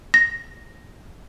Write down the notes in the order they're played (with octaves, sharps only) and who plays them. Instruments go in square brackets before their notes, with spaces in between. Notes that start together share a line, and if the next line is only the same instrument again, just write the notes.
[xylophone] A#6